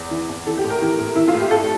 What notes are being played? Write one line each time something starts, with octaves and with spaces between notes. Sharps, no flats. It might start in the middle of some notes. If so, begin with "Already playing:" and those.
Already playing: E2
E3
E2
E3 A4
G4
A2
A#4
E3
A2
E3 E4
F4
A2
G4
G2 A4